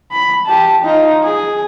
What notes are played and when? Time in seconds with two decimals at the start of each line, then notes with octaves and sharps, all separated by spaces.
0.11 B5
0.46 G4 A5
0.84 D#4 F4
1.23 G#4